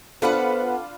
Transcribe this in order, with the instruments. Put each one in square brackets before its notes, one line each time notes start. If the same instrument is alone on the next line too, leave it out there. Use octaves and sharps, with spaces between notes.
[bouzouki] B3 B4 F#5 [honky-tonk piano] D4 F4 B5 [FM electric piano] A4 [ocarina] C5